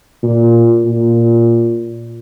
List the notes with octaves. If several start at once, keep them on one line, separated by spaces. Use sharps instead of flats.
A#2
A#2